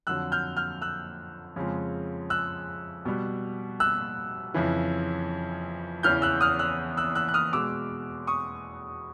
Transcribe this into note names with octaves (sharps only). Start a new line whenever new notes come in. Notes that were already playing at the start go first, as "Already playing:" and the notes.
F2 D3 F#3 E6 F#6
F6 G6
F6 G6
E6 F#6
F2 C#3 F3 G#3
E6 F#6
B2 G3
E6 F#6
F2 C#3 E3
E2 C#3 E3 F6 G6
E6 F#6
D#6 F6
E6 F#6
E6 F#6
E6 F#6
F#6
D#6 F6
B2 G#3 D6 E6
C#6 D#6